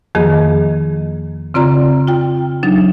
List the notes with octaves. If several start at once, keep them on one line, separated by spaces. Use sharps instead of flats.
F2 D#3 F3 A#3 G#4 D#5
C#3 C4 F4 D5 A#5
F4 G5
F#3 D4 D#4